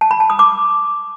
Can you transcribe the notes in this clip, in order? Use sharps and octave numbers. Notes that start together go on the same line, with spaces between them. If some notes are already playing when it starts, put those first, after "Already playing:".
A5
B5
A5
D#6
D6